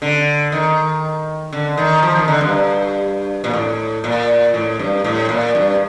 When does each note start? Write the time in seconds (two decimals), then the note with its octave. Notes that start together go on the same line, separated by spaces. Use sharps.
0.02 D3
0.52 D#3
1.53 D3
1.77 D#3
2.03 F3
2.15 D#3
2.28 D3
2.41 G2
3.44 A#2
3.53 A2
4.04 A#2
4.54 A2
4.79 G2
5.04 A2
5.29 A#2
5.55 G2